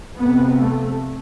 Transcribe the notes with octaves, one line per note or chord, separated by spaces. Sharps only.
F2 C3 B3
A3